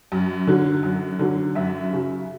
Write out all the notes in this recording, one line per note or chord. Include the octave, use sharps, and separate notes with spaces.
F#2
D3 F#3
F#2
D3 F#3
F#2 E5
C#3 F#3